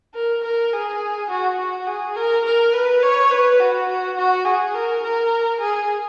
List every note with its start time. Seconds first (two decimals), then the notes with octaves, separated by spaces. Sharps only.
0.15 A#4
0.44 A#4
0.73 G#4
1.30 F#4
1.58 F#4
1.87 G#4
2.16 A#4
2.45 A#4
2.73 B4
3.03 C#5
3.31 B4
3.60 F#4
3.89 F#4
4.17 F#4
4.45 G#4
4.75 A#4
5.04 A#4
5.61 G#4